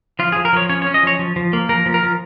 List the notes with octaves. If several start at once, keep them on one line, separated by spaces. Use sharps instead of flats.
F3 F4
G#4
F3
A#4
F3 C#5
C#4 C#5
C#5
C#4
D#5
F3 C#5
F3
F3
A#3
F3 A#4
F3
A#4
F3